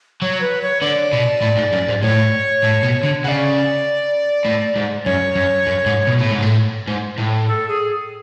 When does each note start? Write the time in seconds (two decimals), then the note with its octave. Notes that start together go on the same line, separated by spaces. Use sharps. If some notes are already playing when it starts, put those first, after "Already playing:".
0.22 F#3 C#5
0.41 B4
0.62 C#5
0.81 D3 D5
1.13 B2
1.42 A2
1.57 G#2
1.73 F#2
1.88 G#2
2.02 A2 C#5
2.64 A2
2.83 B2
3.03 D3
3.24 C#3 D5 F#5
4.45 A2
4.76 G#2
5.05 F#2 C#5
5.36 F#2
5.67 F#2
5.86 G#2
6.07 B2
6.19 A2
6.31 G#2
6.42 A2
6.87 G#2
7.18 A2
7.48 A4
7.68 G#4